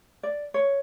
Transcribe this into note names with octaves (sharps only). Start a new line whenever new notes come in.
D5
C#5